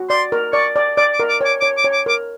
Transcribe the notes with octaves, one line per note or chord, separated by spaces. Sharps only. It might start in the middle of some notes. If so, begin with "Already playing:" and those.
Already playing: F#4
D5 C6
A#4
D5 C#6
D5
D5 D6
D6
A#4
D6
C#5 D6
C#5 D6
D6
C#5
D6
A#4 D6